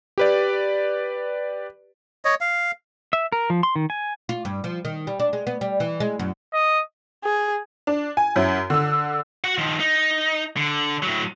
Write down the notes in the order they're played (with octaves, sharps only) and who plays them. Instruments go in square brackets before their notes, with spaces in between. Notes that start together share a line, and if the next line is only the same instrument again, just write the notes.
[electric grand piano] G4 B4 D5
[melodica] C#5 D#5
F5
[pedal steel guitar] E5
A#4
F3
C6
D#3
G#5
[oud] F4
G2
F3
D#3
G3
D4
G#3
B3
G3
E3
G#3
F#2
[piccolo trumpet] D#5
[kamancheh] G#4
[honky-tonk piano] D4
G#5
F#2 C#4 E4
D3 E6
[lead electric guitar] F#4 F#5
D#3 F3
D#4
D3
A2 F#3